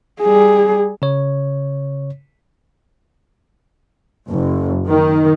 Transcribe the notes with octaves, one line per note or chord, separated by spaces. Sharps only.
G3 G#4
C#3 C#5
F#1
D#3